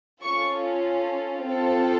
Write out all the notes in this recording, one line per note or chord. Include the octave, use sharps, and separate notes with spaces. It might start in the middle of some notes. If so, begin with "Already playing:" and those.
C#4 F4 A4 C#6
C4 F4 A4